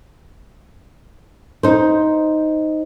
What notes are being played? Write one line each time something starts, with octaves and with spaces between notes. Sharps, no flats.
D#4 C5